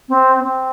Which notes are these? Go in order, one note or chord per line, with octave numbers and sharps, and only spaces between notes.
C4
C4